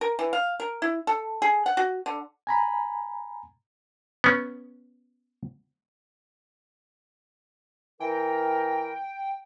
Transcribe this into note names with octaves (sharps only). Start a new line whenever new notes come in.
A#4
E3
F5
A#4
E4
A4
G#4
F#5
F#4
D3
G#5 A#5 B5
B3 C#4
E3 A#4 G5